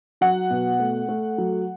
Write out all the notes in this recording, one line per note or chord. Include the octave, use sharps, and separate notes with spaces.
F#3 F#5
B2
A3
A3
F#3